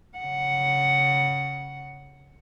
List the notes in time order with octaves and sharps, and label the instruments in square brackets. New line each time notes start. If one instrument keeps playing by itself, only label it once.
[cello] C#3 F#5